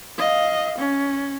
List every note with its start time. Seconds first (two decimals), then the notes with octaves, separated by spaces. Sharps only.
0.18 D#5 F5
0.78 C#4